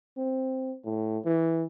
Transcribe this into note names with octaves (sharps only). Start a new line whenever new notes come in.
C4
A2
E3